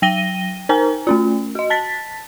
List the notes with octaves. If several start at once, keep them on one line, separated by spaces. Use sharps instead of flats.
F#3 G5 A#6 D#7 G7
D#4 A#4 C5 G#5 A#5
A3 C#4 F4
F#4 D#5
A5 A6 B6